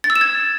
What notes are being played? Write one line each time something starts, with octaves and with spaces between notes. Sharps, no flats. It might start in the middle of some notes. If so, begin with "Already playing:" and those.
A6
E6
E7
G#6